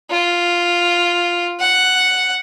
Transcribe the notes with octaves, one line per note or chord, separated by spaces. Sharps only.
F4
F#5